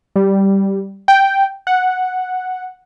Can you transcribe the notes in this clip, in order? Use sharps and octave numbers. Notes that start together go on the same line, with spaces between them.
G3
G5
F#5